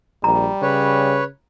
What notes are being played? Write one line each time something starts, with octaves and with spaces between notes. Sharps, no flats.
A#1 G3 A#5
C#3 B4 C#5